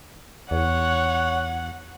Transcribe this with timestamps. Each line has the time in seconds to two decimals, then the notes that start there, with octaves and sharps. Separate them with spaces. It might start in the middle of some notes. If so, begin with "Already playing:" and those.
0.51 E2 C#5 F#5